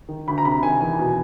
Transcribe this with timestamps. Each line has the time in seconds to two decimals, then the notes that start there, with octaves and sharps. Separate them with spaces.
0.09 D#3
0.28 D2 B5
0.38 A#5
0.45 C3 B5
0.63 D#3 G#5
0.81 E2 G#5
0.99 B2